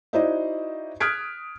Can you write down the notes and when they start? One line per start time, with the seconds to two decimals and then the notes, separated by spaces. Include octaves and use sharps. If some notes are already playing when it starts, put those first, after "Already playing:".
0.13 D#4 E4 F#4 C5 D5 D#5
1.00 D#6 F6 F#6 G#6 B6 D7